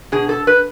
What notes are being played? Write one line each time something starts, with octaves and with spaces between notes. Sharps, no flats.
B2 G#4
A4
B4